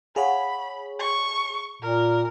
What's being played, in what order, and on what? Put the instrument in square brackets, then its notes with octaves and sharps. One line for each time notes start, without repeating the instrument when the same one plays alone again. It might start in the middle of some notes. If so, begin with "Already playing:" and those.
[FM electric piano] G#4 C#5 [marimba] F5 F#5 [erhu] B5
[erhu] C#6
[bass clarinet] A#2 [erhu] A#4